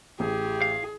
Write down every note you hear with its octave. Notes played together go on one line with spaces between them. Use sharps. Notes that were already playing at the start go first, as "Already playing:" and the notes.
A1 G4 G#4
F5